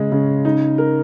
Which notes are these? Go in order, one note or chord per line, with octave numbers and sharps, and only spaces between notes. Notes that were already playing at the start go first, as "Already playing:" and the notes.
Already playing: C#3 G#3 C#4
C#3
D#4
A#4